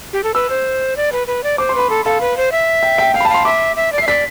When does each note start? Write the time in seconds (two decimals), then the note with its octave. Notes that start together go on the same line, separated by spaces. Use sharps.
0.13 G4
0.24 A4
0.34 B4 E6
0.50 C5
0.97 D5
1.12 B4
1.27 B4
1.44 D5
1.58 C5 D6
1.69 C6
1.75 B4 B5
1.90 A4
2.05 A4 F5
2.21 B4
2.37 C5
2.52 E5
2.83 G5
2.98 G5
3.14 F5 G5
3.20 B5
3.25 A5
3.30 F5 C6
3.45 E5 D6
3.76 E5
3.92 D5
3.98 E5 C7
4.07 D5 B6